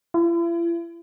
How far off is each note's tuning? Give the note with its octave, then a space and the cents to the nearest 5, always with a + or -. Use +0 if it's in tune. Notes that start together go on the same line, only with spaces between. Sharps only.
E4 +45